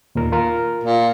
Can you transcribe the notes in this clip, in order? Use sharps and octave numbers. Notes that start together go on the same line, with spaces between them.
D#2 A#2 A#4
F4 A#4
A#2